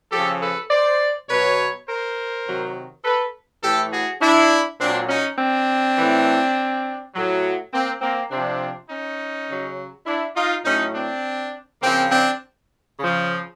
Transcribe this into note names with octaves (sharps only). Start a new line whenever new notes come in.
C#3 F3 G4 A4
A4 B4
C5 D5
B2 F#3 B4 C#5
A#4 C5
C3 D#3 F#3
A4 B4
A2 E3 G4 A4
F#4 G#4
D4 E4
A#2 F#3 C4 D4
C#4 D#4
C4 D4
A2 E3
A2 F#3
A#3 C4
A#3 C4
C3 F3 C4 D4
C#4 D#4
C#3 F#3
D4 E4
D#4 F4
A2 F#3 C#4 D#4
C4 D4
C#3 F3 A#3 C4
C4 D4
C#3 F3